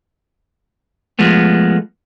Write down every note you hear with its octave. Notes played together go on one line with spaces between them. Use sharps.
F3 G#3 A3 B3